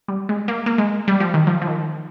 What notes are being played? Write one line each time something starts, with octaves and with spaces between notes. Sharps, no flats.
G3
G#3
A#3
A#3
G#3
G3
F3
D#3
F3
F3
D#3